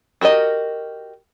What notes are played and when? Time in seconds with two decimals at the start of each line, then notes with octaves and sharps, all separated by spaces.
0.21 F#4 G4 A#4 D#5